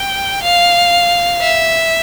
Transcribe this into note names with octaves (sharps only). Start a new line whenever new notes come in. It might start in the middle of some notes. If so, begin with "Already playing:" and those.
Already playing: G5
F5
E5